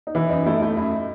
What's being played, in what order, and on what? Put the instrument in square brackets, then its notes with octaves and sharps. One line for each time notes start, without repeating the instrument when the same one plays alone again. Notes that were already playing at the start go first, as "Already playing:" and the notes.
[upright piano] D#4
[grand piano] E3 [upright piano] E4
[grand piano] F#2 [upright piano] D#4
[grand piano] A3 [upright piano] E4
[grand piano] A3 [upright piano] E4
[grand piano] F#2 [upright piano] E4